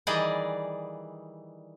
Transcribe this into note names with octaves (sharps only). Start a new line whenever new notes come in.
D#3 E3 G3 G#4 D5 D#5